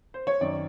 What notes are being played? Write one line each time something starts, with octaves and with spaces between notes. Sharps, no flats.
C5
C#5
F#2 D#3 D5